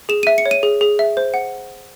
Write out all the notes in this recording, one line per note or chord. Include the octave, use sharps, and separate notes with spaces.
G#4 E7
E5 D#7
C#7
C#5
D#7
G#4
G#4
E5
C5
F#5